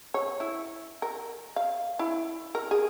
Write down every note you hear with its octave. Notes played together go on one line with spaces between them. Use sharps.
C#5
E4
A#4
F5
E4
A#4
G#4